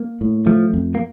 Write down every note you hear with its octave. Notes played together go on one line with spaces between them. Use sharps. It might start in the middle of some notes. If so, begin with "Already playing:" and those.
Already playing: A#3
A2
F3 A3
F2
A#3